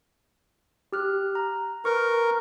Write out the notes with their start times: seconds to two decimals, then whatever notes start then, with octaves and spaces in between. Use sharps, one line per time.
0.92 G4 F6 F#6
1.35 A#5
1.85 A#4 B4 C#6